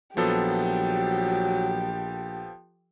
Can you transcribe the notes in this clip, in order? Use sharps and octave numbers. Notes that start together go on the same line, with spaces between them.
A#1 F3 F#3 B3 G4 A4